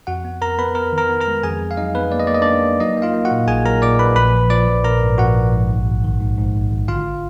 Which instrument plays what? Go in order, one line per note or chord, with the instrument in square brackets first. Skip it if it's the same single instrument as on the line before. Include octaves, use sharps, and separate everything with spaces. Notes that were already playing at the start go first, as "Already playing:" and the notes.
[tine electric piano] F2 F#4 F#5
B3
F2 A#4 A#5
B3 B4 B5
B3 A#4 A#5
D#3
A#4 A#5
B3
A#4 A#5
G#3
F2 G#4 G#5
F2
F5
F#3 D#4 D#5
F2 B3 B4
A#3 D5
D#5
A#3 D5
D#5
A#3 D4 D5
A#3
F#3 D#4 D#5
A#3
F4 F5
A#3
F#4 F#5
A#2
A#1 G#4 G#5
F#3 A#4 A#5
A#2 D5 D6
A#2 B4 B5
A#1 B4 B5
F3
F3 D5 D6
A#1
A#1 A#4 A#5
G#2
A#1 F#4 F#5
A#1
G#2
G#1
G#1
D#3
G#2
G#2
G#1
G#1
D3 F4 F5